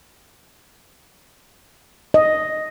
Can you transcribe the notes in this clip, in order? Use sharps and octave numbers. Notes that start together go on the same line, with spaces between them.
D#5